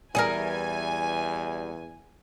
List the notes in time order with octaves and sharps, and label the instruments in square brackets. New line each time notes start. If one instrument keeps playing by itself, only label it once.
[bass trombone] E2 [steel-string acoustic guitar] E3 G3 [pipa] G#4 A#4 [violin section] G#5